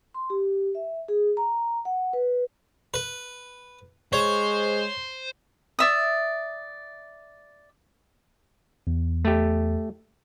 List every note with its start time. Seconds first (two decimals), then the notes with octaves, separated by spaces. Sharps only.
0.14 C6
0.30 G4
0.75 E5
1.08 G#4
1.37 A#5
1.85 F#5
2.13 B4
2.94 B4
4.13 G#3 C5 C#5
5.79 D5 E5 D#6
8.87 E2
9.25 A3 G4